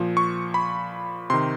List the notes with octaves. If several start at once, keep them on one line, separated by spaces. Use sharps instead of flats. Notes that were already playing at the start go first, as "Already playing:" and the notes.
Already playing: A#2 F3
C#6
B5
C3 D#3 C6